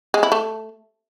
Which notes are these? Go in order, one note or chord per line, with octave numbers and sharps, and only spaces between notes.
G#3
E4
A3